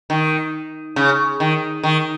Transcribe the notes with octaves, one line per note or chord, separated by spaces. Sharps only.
D#3
C#3
D#3
D#3